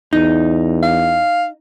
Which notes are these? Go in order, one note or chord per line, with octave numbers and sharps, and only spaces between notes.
E2 D#4
F5